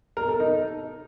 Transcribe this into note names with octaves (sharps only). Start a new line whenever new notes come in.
A#4
A4
D#4